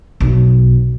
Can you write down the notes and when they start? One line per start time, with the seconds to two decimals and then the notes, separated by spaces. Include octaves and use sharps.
0.20 B1